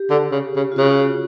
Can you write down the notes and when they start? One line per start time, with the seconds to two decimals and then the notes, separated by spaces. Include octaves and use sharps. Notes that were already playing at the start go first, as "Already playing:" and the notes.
Already playing: G4
0.10 D3
0.32 C#3
0.56 C#3
0.72 F4
0.78 C#3 F#4